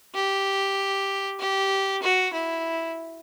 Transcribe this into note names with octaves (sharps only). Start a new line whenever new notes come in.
G4
G4
F#4
E4